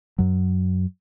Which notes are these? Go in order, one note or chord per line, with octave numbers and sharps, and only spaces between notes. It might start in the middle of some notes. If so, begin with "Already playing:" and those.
F#2 F#3